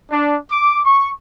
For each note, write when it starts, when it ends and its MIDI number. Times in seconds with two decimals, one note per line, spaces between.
0.11 0.37 62
0.50 0.80 86
0.85 1.10 85